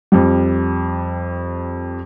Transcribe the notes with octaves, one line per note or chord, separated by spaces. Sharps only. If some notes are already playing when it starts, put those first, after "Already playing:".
F2 G3